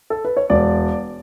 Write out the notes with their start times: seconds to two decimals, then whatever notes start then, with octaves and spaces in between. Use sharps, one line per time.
0.10 A4
0.25 B4
0.37 C#5
0.50 E1 D5